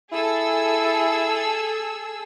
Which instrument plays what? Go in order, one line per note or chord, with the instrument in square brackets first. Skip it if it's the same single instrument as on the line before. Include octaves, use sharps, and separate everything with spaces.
[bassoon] E4 [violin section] G#4 A4 E6